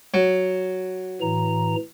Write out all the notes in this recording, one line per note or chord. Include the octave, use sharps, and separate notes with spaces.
F#3
A2 E3 A#5